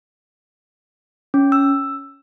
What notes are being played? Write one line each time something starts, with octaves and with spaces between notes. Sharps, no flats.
C#4
E6